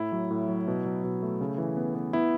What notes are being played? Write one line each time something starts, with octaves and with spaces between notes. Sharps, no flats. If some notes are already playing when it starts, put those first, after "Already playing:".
Already playing: A2 E4
F#3
A2
F#3
B2
F#3
B2
A3
C#3
E3
B3
B3
B3 E4